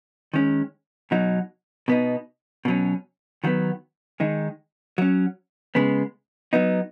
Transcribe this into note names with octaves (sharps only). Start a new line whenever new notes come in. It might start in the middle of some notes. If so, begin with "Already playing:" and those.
D#3 G#3 C#4
B2 F#3 D#4
B2 B3 D#4
B2 F#3 C#4
D#3 F#3 B3
D#3 G#3 D#4
F#3 C#4
C#3 G#3 B3
F#3 B3 D#4